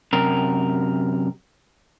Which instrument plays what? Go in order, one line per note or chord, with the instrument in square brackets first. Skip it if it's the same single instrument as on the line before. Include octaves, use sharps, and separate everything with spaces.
[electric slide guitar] F#2 C3 A#4